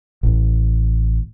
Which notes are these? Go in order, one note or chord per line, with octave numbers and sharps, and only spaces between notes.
A1